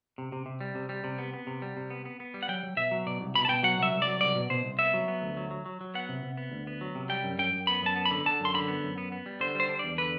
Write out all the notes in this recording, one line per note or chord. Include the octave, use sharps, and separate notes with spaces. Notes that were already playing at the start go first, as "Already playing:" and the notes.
C3
C3
C3
G3
C3
G3
C3
B3
B3
C3
G3
C3
B3
B3
B3
G3
F#5
F#3 G5
F#3
B2 E5
F#3
B2 D5
C2
B2 B5
A5
B2 G5
F#3 F#5
C2 E5
C2
D5
F#3
C2 D5
B2
B2 C5
C2
B3 E5
F#3
B3
D2
F#3
F#3
F#3
F#3
B3 F#5
C3
C3
B3
D2
B3
F#3
C3
G3 G5
F#2
F#2 G5
F#2
B3 B5
F#2 A5
B3
B5
D3
D3 A5
F#2 C6
D3 B5
B3
F#2
B3
B3
G3
D3 C5
G3 C5
D4
E2 D5
D3 B4